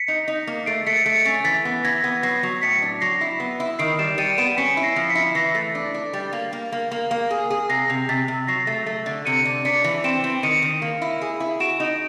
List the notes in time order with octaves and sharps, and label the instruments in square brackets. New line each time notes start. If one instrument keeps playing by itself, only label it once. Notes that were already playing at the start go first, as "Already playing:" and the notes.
Already playing: [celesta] B6 C#7
[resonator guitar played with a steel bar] D#4
D#4
A#3
[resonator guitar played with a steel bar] A3 [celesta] C7 D7
[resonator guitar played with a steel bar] A3 [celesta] B6 C#7
[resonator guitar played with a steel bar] A3 [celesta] B6 C#7
[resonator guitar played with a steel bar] C#4 [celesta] A6 B6
[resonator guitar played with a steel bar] E3 [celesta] A6 B6
[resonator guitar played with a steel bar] B3
[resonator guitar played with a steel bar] E3 [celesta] G#6 A#6
[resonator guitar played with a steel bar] B3
[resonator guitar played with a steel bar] F#3 [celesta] A#6 C7
[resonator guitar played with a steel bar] F#3
[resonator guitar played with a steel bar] A2 [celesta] B6 C#7
[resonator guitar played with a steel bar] D4
[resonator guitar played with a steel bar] F#3 [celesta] A#6 C7
[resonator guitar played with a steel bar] E4
B3
E4
[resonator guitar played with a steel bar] D#3 [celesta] C7 D7
[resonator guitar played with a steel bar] G3 [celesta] D7 E7
[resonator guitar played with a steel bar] G3 [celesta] C#7 D#7
[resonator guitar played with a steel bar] B3 [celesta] D7 E7
[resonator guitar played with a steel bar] C#4 [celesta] B6 C#7
[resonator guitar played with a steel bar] E4
[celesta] A#6 C7
[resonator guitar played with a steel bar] F3
[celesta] B6 C#7
[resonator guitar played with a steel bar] E4
[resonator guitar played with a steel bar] E3 [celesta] A#6 C7
[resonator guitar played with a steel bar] A3
D4
D4
G3
A#3
A#3
A#3
A#3
A#3
G#4
G#4
[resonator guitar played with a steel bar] C3 [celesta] A#6 C7
[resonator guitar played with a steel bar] C3
[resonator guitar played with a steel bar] C3 [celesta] A6 B6
[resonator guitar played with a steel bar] C3
[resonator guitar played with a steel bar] F#3 [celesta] A#6 C7
[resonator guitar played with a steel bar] A3
A3
D3
[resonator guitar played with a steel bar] C3 [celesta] C#7 D#7
[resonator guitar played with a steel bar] D4
[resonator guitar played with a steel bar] D4 [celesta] B6 C#7
[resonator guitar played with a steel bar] E3
[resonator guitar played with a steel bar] C4 [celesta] D7 E7
[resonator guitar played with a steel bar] C4
[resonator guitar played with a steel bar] D#3 [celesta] C#7 D#7
[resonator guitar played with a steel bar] D#3
A#3
E4
G#4
E4
[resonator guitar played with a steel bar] F#4 [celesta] D7 E7
[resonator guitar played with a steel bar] D#4